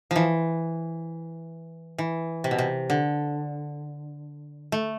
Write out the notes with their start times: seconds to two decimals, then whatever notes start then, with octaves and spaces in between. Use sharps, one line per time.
0.11 E3 F3
1.98 E3
2.44 C3
2.51 B2
2.58 C3
2.90 D3
4.72 A3